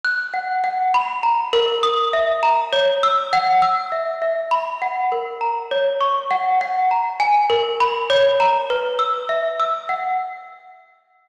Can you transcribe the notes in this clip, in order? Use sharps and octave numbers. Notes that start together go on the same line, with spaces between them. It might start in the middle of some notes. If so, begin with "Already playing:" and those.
F#6
F#5
F#5
B5
A#5
A#4
D#6
E5
A#5
C#5
E6
F#5
E6
E5
E5
B5
F#5
A#4
A#5
C#5
C#6
F#5
F#5
A#5
G#5
A#4
B5
C#5
A#5
B4
E6
E5
E6
F#5